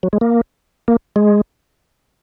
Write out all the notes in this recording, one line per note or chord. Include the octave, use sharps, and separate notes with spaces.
F#3
G#3
A#3
A#3
G#3